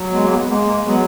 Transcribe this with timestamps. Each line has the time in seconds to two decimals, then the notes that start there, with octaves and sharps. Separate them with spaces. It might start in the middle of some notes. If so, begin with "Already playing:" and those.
Already playing: F#3
0.12 G#3 B3
0.24 A#3
0.30 G#3 B3
0.43 B3
0.48 G#3 A#3
0.67 A#3
0.84 F#3 G#3 B3